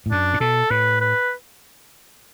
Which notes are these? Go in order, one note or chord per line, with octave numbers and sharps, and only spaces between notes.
A2
F#2 D4
A2
B2 A4
A2 B4
B4